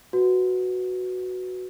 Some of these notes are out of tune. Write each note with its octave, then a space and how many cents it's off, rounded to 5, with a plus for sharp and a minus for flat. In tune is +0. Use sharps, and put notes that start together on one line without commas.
F#4 +0 B4 +0